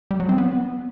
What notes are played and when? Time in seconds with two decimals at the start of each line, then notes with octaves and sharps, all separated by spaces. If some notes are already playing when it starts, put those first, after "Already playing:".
0.11 G3
0.20 F#3
0.29 C4
0.38 B3